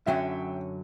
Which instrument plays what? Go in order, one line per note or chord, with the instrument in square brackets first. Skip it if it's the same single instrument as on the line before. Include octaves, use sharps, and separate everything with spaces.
[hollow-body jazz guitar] F#2 D3 F#3 C#4 [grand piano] E5 G5